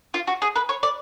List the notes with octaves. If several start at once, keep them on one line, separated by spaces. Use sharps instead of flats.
F4
F#4
G#4
B4
C#5
D5